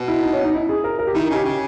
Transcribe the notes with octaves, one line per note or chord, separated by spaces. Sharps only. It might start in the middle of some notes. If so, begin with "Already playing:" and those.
Already playing: B2
E4
D#4
C#4
D#4
E4
G#4
A#4
A#4
G4
D#3 E4
D#4
C#3 G4
C#3 G4